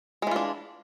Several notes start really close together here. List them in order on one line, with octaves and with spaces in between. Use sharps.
G#3 E3 F4 D4